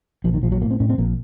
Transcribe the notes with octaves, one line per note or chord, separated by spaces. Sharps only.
A#1 F3
D#3
A#1 F3
F#3
A2 A#3
C4
A2 C#4
C4
A#1 A#3